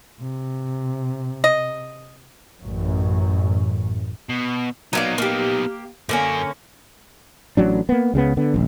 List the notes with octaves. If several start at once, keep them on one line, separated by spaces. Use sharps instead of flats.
C3
D#5
A1 F#2
B2
F#3 A#3 B3 D#4 D5
A#3 G4
F#2 D3 A#3 C#4 A#4
A1 F#3 D4
A#3 B3
C#2 C#3 F#3 B3
D3 B3
D#1 A#1